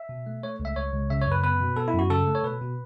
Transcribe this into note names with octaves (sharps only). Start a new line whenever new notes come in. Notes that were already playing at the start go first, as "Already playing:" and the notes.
Already playing: E5
B2
A3
A3 C#5
C#2
E5
C#2 C#5
C#2
C#3 E5
C#5
F#2
B4
B3 B4
B2
B3 A4
E4
F#2 F#4
C#3 A4
A3
C#5
B2 B4
B2